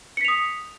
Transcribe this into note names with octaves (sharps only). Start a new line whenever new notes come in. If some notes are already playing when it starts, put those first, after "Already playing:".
D#6 B6 C#7 F7